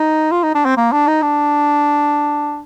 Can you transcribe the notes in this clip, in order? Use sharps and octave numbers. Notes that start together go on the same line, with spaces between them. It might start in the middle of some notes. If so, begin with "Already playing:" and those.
Already playing: D#4
F4
D#4
D4
C4
A#3
D4
D#4
D4